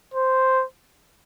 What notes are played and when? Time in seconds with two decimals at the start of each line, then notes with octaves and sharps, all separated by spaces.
0.14 C5